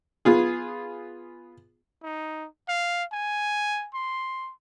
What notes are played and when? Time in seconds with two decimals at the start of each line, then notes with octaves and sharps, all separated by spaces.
0.25 B3 F4 G#4
2.03 D#4
2.68 F5
3.12 G#5
3.94 C6